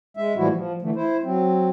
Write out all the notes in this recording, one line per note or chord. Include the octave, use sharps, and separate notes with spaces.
G#3 E5
A2 E3 F3 G3 E4 F#4
F3
D3 E3 A3
E4 C5
F#3 C4